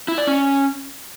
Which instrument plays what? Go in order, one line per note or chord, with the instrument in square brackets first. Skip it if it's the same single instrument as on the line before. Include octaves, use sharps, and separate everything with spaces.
[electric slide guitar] E4
D5
C#4